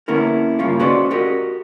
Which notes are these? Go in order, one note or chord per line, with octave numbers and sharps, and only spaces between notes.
D3 A#3 B3 C#4 E4 A#4
G2 C#3 G#3 A#3 C#4 F4
C#4 F#4 B4 C5 D5 D#5
F#4 G4 A#4 D#5